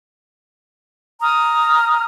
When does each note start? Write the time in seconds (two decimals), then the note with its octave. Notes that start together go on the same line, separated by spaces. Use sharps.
1.22 A#5 D#6 F6